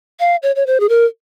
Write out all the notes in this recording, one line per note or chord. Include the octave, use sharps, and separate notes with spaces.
F5
C#5
C#5
C5
G#4
A#4